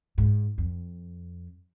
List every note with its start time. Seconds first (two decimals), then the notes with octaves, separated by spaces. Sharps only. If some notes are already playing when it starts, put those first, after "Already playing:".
0.18 G#2
0.58 F2